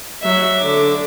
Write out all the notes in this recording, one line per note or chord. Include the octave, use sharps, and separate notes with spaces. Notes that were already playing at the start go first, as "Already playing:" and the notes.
F#3 E5
D3 D6